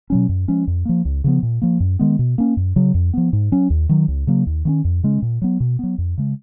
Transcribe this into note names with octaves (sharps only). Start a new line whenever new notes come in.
B2 F#3 C#4
F#2
F3 G#3 C#4
F2
F3 A#3
C#2
C#3 F3 B3
A#2
F3 A#3
F#2
D#3 G#3 B3
B2
A#3 C#4
F#2
C#3 F#3
F2
F3 B3
G#2
F#3 C#4
D#2
D#3 F#3
C#2
C#3 F#3 A#3
D#2
D#3 A#3 C#4
F2
C#3 G#3 C#4
A#2
F#3 B3
B2
F#3 B3
F2
C#3 G#3